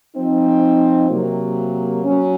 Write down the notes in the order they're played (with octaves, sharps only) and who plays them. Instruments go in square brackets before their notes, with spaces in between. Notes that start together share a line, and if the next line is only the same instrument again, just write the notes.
[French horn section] F3 C4 D#4
C3 F#3 A#3
F#3 C#4